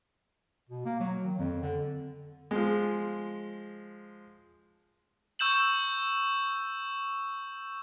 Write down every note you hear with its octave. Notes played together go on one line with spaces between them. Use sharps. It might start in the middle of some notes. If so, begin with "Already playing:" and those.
B2
A#3
F#3
D#3
F2
D3
F3 G#3
C#6 E6 G6 E7 F#7